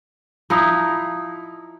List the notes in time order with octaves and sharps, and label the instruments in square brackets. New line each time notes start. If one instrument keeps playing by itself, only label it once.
[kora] F3 D#4 E4